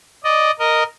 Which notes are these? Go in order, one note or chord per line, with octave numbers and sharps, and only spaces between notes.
D5 D#5
A#4 D#5